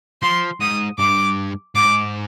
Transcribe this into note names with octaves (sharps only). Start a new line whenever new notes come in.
F3 C6
G#2 D#6
G2 D6
G#2 D6